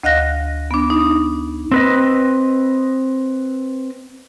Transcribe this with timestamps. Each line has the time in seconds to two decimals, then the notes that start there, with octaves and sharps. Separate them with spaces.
0.03 D2 D#5 F5 F#6 A#6
0.71 B3 D4
0.90 D#4
1.72 C4 B4 D#5